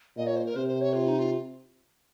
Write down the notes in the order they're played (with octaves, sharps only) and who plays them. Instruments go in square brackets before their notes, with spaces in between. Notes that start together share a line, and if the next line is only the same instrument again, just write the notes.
[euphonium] A#2 [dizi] D#5
[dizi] C#5
C5
A#4
[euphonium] C3 [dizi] C5
[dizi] C5
C#5
F4
D#4
F4